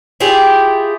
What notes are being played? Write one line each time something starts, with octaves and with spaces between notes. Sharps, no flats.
E4 F4 G4 G#4